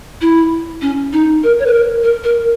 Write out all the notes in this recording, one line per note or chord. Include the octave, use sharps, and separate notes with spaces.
E4
C#4
D#4
A#4
C#5
B4
A#4
A#4
A#4